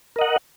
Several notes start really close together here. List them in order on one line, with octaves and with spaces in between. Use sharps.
A#4 D#5 F#5